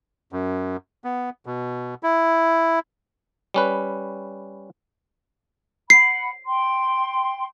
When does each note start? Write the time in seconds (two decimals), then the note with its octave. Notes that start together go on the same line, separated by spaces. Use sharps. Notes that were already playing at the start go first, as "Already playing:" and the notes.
0.32 F#2
1.04 B3
1.46 B2
2.03 E4
3.54 G3 C#4 B4
5.90 F#5 B5 C7
6.46 G5 C6